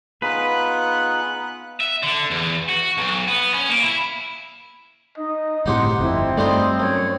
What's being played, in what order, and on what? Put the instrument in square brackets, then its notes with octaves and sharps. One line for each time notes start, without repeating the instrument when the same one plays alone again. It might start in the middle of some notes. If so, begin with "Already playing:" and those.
[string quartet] B3 F#5 F#6 [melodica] D#4 F4 G#4 [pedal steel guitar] B4
[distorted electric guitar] E5
D3
E2
F#4
B1
B3
C#4
A#3
E4
[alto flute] D#4 [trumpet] D#5
[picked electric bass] G1 A2 C3 [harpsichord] D#4 G4 C5 [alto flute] F#5
[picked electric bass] G1 F2 [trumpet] C4 [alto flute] E4
[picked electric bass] G2 A3 [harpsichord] G3 F4 C5 [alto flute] D#4
[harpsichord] F#2 [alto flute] C#5